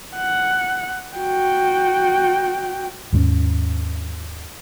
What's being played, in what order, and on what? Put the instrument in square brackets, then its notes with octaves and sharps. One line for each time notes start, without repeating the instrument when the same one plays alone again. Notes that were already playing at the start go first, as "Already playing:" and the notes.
[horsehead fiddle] F#5
F#4 G5
[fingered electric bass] D#2 G#2 A3 C#4